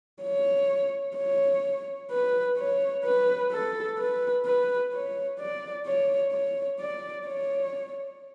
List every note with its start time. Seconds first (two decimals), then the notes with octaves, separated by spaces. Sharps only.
0.23 C#5
1.17 C#5
2.11 B4
2.58 C#5
3.04 B4
3.52 A4
3.99 B4
4.45 B4
4.93 C#5
5.39 D5
5.87 C#5
6.33 C#5
6.80 D5
7.27 C#5